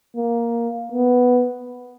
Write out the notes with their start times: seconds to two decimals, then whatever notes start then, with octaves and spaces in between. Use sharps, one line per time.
0.16 A#3
0.92 B3